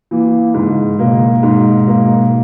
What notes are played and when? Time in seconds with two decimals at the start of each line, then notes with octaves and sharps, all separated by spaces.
0.11 E3 A#3
0.54 G#2 C#3
0.99 B2 A#3
1.43 G#2
1.88 A#3